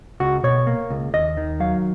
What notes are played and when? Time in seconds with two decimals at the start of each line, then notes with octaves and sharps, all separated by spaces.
0.20 C#2 F#4
0.44 B2 C#5
0.67 A#3
0.90 C#2
1.14 D#2 D#5
1.37 D#3
1.60 F#3 F5